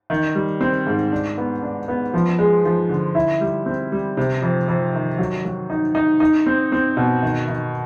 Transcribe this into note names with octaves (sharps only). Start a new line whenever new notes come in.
D#3
G3
C4
G#2
D4
B3
D4
B3
F3
G#3
F3
D3
E4
G3
C4
G3
C3
F2
F2
D#3
F#3
F#3
D#4
D#4
D#4
C4
C4
B2
D#3
D#3